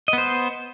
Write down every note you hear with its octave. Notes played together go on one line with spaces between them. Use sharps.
B3 C5 D#5